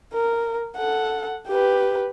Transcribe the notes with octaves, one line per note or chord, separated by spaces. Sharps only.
A#4
A4 F#5
G4 B4